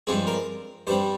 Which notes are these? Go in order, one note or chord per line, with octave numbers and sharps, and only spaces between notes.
G2 F3 G#3 C4 G#4
A#4
G2 G3 C4 C5